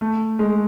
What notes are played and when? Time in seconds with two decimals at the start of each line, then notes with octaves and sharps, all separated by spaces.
0.01 A3
0.39 G#3